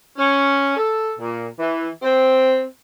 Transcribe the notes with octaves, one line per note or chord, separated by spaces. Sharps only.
C#4
A4
A#2
E3
C4